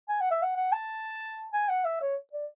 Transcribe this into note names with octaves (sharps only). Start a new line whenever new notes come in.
G#5
F#5
E5
F#5
F#5
A5
G#5
F#5
E5
C#5
D5